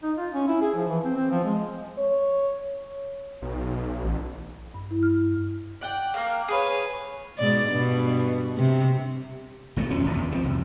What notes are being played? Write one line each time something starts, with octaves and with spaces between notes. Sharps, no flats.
D#4
F4
C#4
E4
G#4
F3
E3
C4
C4
F3
G#3
C#5
B1
A1
G2
E4
F6
D5 F#5 G5
A#3 A#4 F5
G#4 B4 C#5
G#2 B2 D5
G2 B2
C3
G#1 B2 E3 A3
D#1 F2 F3 C#4
A#1 E2 A#2
D#2
G2 F3 C4
C2 F2